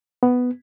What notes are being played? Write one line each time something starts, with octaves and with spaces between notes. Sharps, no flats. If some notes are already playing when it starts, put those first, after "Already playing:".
B3